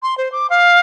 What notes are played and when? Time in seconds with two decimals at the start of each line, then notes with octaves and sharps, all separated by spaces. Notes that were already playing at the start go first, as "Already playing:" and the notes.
0.03 C6
0.18 C5
0.32 D6
0.50 F5